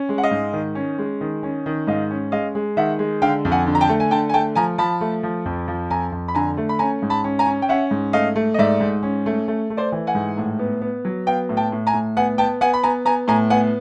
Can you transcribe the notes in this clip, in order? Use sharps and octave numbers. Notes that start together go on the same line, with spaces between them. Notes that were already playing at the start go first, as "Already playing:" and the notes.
Already playing: C#4
G#3
F#5
D#5 F5
G#2
D#3
C#4
G#3
D#3
C#4
D#3
G#2 D#5 F5
C#4
G#3 D#5 F5
G#3
D#3 E5 F#5
G#3
D3 F5 G5
F2
F#5 G#5
D3
A#5
G5 A5
A3
G#5
D3 G5 A5
G#5
A3 G5 A5
F3 G#5 A#5
F3 A5 B5
A3
F3
F2
F3
F2 G#5 A#5
F2
B5
D3 G#5 A#5
A3
B5
C#4 G#5 A#5
G#2
A5 B5
C#4
G#5 A#5
C#4
G5
C#4 E5 F#5
G#2
A3 D#5 F5
A3
D#5
G#2 D5 E5
G#2
C#4
A3
A3
A3
C5 D5
E3
F#5 G#5
G#2
A2
B3
B3
F#3
B3 F5 G5
A2
G5 A5
A2
G#5 A#5
A2
B3 F#5 G#5
B3 G5 A5
B3 F#5 G#5
B5
B3 G#5 A#5
B3 G#5 A#5
A2 G#5 A#5
B3 F#5 G#5